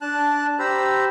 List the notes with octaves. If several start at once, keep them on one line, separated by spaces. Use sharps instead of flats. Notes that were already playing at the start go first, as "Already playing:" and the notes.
D4 A5 F#6
G4 C5 A#5 B5 E6